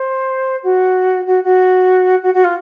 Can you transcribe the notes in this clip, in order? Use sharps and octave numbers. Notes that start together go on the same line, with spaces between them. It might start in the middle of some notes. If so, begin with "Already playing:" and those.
Already playing: C5
F#4
F#4
F#4
F#4
F#4
F4